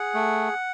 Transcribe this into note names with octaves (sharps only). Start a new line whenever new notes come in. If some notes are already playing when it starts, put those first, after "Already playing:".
Already playing: G#4 F#5
A3